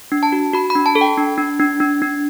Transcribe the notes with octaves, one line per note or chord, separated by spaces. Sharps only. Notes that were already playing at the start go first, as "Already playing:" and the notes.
D4
A5
F#4
F#4 B5
B5
D4
A5
A4
G5
D4
D4
D4
D4
D4